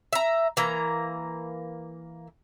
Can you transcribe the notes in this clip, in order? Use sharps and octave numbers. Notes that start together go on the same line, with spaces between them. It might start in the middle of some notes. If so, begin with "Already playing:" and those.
E5 A#5
E3 A#3 A#5